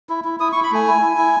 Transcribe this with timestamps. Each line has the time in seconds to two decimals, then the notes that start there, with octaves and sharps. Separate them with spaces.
0.09 E4
0.24 E4
0.40 E4 D#6
0.52 C#6
0.56 E4
0.63 B5
0.71 A3 G#5
0.87 E4
1.02 E4
1.17 E4